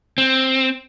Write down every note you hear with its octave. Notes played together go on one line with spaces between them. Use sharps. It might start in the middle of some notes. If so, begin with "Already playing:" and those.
C4